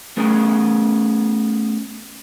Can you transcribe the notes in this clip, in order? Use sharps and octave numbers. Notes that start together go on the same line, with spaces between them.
A3 B3 C#4 G#4 A#4 B4